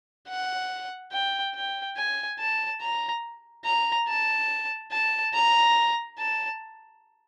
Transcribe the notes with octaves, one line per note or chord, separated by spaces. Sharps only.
F#5
G5
G5
G#5
A5
A#5
A#5
A5
A5
A#5
A5